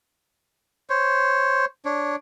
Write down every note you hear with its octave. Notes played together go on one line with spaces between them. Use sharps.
C5 C#5
D4 C#5